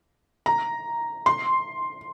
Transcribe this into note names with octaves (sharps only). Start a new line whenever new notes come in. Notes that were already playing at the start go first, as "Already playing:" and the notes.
A#5
C6